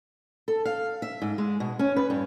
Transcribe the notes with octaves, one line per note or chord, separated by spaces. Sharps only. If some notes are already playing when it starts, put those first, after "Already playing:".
A4
F5
E5
G#2
G#3
B2
C#4
B4
G2